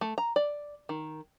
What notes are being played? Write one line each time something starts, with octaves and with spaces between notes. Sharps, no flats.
A3
A#5
D5
D#3